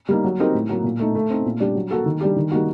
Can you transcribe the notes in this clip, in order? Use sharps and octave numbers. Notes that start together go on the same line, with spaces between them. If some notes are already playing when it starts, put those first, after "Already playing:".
G3 A#3 D#4
F#3
C4 D#4 G4 A#4
A2
F#3 A#3 F#4
A#2
A3 D#4
A3
C4 D#4
A#2
G3 D4 G4
F#3
A#3 F#4 A4
D#3
G3 D4 G4
D#3
G3 A#3 D#4 F#4